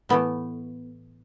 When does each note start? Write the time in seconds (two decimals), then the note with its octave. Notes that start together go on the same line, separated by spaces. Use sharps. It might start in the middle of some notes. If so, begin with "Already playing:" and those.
0.09 A2 E3 A3 B3